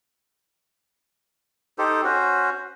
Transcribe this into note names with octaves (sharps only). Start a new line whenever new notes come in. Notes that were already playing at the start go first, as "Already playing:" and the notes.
D#4 G4 A4 C5
C#4 F#4 C5